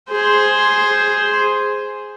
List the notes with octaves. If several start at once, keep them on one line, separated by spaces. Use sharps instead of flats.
G#4 C5